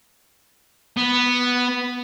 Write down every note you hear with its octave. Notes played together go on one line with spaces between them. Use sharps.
B3